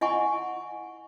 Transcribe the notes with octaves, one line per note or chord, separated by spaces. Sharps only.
E4 D#5 F#5 G#5 B5 C#6